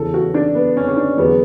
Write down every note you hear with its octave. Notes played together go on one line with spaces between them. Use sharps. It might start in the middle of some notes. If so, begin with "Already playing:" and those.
Already playing: E2 C#3 E3 A4
F#4
D4
B3
C#4
C#4
D4
E2 D3 F#3 B3